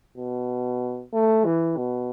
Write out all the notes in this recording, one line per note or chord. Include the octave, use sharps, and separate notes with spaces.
B2
A3
E3
B2